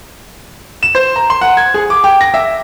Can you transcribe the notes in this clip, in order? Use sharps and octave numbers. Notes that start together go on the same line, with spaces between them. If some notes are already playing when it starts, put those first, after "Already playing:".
E7
C5
A#5
C6
F#5
G#6
G#4
D6
G5
A#6
E5